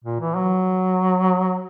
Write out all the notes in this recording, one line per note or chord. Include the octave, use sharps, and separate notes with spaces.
A#2
E3
F#3